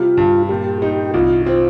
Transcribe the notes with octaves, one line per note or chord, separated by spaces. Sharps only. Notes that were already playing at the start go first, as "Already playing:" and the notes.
Already playing: C3 G3 F4
G2
A#2 G4
D#4 G4
C2 F4
C4 F4